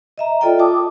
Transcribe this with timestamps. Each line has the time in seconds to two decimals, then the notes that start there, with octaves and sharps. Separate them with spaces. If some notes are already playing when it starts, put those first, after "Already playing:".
0.18 D#5 E5 A#5
0.41 F4 A4 D5 D#5 G5
0.59 A5 D6 D#6